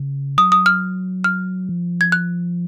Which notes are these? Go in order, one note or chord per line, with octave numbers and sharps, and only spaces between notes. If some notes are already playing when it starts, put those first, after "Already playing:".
Already playing: C#3
F#3 D#6
D#6
F6
F6
F3
G#6
F#6